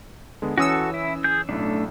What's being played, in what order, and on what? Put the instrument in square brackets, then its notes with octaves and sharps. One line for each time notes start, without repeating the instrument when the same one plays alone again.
[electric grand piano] D3 G#3 B3
[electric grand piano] E3 D#6 [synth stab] C#4 E6 [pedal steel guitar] F#4 A4
[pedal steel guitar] E4
G#4 G6
[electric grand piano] B1 A2 [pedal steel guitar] A3 D4